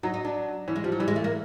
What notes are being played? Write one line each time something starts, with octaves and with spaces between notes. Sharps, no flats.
F#3 D#4
D#4
D4
E3 C#4
G#3
F3 G3
F#3
E3 G3
G#3
A3
A#3